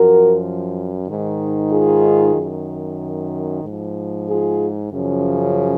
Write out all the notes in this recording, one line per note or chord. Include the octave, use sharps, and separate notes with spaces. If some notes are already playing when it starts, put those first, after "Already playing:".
Already playing: F#2 F3 F#4 A#4
G#2 D#3
F4 G#4
F#2 D#3
G#2 F3
F4 G#4
F#2 C#3 F3